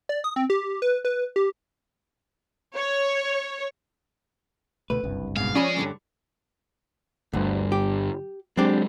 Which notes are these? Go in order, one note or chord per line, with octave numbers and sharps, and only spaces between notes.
D5
D#6
C4
G4
B4
B4
G4
C#5
D2 B2 A3 B4
F#1 C2 G2
G#2 B2 F5
F3 C#4 G#4 D5 D#5 G#5 B5
G2 D3 G3
G1 D2 G2
G4
F#3 G#3 C4 D4 G4